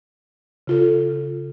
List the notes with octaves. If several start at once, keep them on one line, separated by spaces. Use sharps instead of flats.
C#3 F4 A4